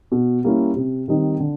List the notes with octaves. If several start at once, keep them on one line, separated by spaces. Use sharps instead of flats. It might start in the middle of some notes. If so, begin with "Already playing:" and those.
B2
G3 A#3 C#4 E4
C3
D#3 G3 C4 D#4
D3